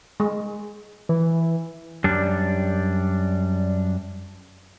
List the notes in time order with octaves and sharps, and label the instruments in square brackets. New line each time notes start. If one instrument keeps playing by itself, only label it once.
[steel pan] G#3
[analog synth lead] E3
[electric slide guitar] F#2 G3 D4